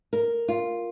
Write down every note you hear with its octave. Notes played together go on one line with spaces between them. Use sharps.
A#4
F4